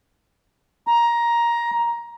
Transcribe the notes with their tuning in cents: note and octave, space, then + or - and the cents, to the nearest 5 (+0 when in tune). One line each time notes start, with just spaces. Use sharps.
A#5 +15